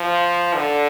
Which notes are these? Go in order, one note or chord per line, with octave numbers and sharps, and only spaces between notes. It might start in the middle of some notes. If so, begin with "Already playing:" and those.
Already playing: F3
D3